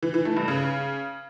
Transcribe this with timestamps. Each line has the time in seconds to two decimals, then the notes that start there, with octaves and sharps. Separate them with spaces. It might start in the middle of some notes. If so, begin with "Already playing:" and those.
0.03 E3
0.14 E3
0.25 A3
0.37 G2
0.48 C#3